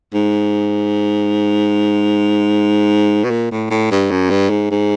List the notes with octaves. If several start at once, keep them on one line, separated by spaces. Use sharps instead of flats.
G#2
B2
A#2
A2
A2
G2
F#2
G2
G#2
G#2